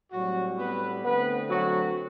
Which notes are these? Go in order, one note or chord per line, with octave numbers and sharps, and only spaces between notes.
A2 F#3 G3 C4 F#4
B3 B4
D3 A3 B3 C4 B4
F#3 F#4